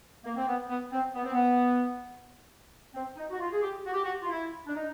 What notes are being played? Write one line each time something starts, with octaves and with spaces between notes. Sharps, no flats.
A#3
C4
B3
B3
C4
B3
C4
B3
C4
D#4
F#4
F4
G#4
G4
F#4
G4
F#4
F4
E4
D4
D#4